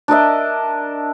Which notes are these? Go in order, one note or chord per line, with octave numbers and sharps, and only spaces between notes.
D4 A#4 D#5 E5